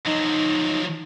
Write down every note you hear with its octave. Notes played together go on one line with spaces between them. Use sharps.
F3 F#3 D#4